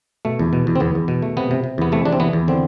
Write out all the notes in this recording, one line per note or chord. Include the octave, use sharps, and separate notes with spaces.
B2 A3
E2
B2
E2
C4
E2 B3
E2
B2
A3
C3 B3
C3
C3
E2 B3
C3 A3
E2 D4
C4
E3 B3
E2
D3 C4